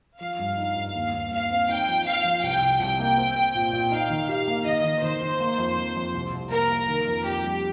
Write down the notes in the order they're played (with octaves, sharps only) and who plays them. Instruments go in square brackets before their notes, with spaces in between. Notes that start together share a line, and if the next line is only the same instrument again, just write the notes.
[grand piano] F3 [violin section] F5
[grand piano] G2
D#4
G2
D#2
D#2
[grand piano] D#2 [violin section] F5
[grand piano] C4
[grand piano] D#4 [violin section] G5
[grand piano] F3
[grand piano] F3 [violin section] F5
[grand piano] F3
[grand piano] C2 [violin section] G5
[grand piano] C2
[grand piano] C2 [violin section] G5
[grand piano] A#3
C4
C4
A#2
A#2
[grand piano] D#4 [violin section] F5
[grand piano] D#3
[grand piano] G4 [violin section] F5
[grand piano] A#3
[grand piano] D#3 [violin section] D#5
[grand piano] D#3
[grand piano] D#3 [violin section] C5
[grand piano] D#3
A#3
F2
F2
F2
C2
C2
[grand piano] A#3 [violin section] A#4
[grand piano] A#3
D#3
F2
[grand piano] F2 [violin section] G4
[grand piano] G3